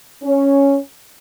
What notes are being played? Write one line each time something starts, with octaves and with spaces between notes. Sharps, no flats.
C#4